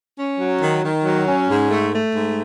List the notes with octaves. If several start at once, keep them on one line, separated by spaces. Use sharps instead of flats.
C#4
F#3
D#3
D#3
F#3
C#4
G#2
A3
A3
G#2